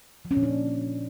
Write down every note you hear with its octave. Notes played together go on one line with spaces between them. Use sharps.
F3
C#4
A#2
D4